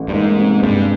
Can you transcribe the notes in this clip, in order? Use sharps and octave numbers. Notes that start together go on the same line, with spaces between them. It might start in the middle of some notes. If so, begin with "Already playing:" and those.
Already playing: A1 A2
G2
G#2 A#3
C3
G2 G#3